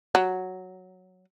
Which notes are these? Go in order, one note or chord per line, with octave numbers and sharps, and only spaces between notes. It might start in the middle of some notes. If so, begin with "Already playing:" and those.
F#3